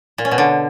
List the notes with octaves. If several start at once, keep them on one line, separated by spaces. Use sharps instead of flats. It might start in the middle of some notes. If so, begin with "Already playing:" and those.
A#2
C#4
B2
D3